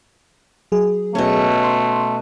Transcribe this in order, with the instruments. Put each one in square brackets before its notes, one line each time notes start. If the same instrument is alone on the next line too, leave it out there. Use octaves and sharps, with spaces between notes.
[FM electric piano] F#3 G#4
[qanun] B2 C#4 [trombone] A3
[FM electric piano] C6